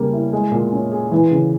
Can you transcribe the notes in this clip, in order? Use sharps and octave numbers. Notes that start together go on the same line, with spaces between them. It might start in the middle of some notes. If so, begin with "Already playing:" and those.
Already playing: C#3 G3 A#3
E4
G#3
A#2
C#4
G#4
E3
C#3